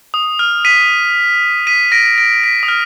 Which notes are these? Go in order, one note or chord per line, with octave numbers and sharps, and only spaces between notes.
D#6
F6
B6 D#7
B6 D#7
A#6 D7
A#6 D7
B6
D#6
F6